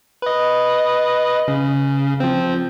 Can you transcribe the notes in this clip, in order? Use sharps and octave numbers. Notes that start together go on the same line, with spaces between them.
B4 D#5
C#3
F3 C4